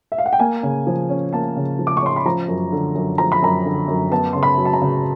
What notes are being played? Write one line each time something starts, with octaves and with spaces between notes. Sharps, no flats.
E5
F5
F#5
G5
A#3 G#5
C#3
F3
C#4
A#3 A5
C#3
F3
D6
C#6
C#4 C6
B5
F3 A#5
F#2
D3
F#2
F3 A#5
B5
F#2 A#5
D3
F#2
B3 A5
C#3 C6
B5
F#3
A5
A#5
C#3